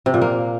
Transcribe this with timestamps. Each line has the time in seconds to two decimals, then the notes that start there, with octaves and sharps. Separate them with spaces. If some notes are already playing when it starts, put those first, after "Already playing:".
0.06 C3
0.14 A#2
0.22 A#3